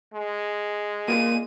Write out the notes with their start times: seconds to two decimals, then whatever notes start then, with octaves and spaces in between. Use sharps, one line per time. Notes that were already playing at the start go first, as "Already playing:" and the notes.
0.14 G#3
1.08 A#2 A#3 D#7